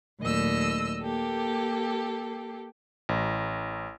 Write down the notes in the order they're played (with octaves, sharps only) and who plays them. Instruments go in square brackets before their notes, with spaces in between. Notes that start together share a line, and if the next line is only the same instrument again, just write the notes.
[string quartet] D#2 A#2 F#3 A3 D#5 E6
A#3 G4 A4
[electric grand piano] A1